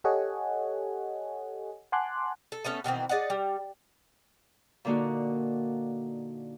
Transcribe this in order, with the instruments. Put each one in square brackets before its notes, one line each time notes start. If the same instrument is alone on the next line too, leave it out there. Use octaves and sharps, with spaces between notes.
[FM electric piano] G4 A4 C#5 D#5 F#5 G#5
F#5 G#5 A5 C6 D6 F#6
[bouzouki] A4
A3 B3 C#4 A4
B2 D#3 E3 C4
G#4 D5 D#5 F#5
G3
[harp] A#2 D3 A#3 D#4 F#4